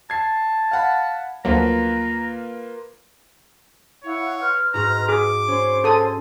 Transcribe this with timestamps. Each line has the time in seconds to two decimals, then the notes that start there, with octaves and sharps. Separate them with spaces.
0.10 A5 G#6 C7
0.71 F5 F#5 B5
1.45 D2 F3 F#3 A#3 F4 B4 A#5
4.04 E4 C#5 F5 F#5
4.40 B4 C6 F6
4.74 G#2 F#4 A#5
5.09 G#4 D6
5.48 C#4 C5 C#5 C6
5.84 A4 D#6